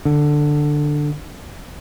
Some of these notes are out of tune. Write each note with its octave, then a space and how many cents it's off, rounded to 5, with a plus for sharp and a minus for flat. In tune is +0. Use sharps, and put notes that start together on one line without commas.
D3 +10